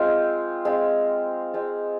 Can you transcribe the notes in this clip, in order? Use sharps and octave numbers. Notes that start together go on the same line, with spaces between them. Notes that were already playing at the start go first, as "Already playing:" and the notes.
Already playing: G#3 C4 F4
G#3 C4 F4
G#3 C4 F4